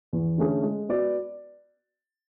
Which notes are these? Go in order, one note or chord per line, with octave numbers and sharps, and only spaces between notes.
E2
D3 A3 C#4 G#4
G#3
B3 F#4 B4 D5